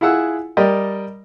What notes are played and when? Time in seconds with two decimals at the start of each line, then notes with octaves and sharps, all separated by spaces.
0.01 E4 F4 G#4 F#5 E6
0.57 G3 A#4 D5 D#5 G5